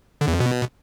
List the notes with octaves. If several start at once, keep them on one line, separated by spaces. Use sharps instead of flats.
D3
E2
F2
B2